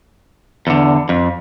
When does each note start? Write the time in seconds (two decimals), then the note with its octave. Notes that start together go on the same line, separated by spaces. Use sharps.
0.67 E2 D3
1.09 F2